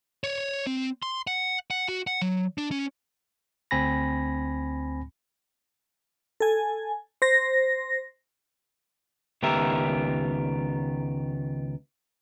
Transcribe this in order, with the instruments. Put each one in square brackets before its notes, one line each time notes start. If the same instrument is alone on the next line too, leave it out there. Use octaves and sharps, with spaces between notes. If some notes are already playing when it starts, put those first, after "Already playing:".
[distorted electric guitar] C#5
C4
C6
F#5
F#5
F#4
F#5
F#3
D4
C#4
[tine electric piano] D2 C4 G#5 B5 A#6
[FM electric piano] A4 G#5
C5 A#6
[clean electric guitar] C#2 D#3 B3 G4 A#4 E5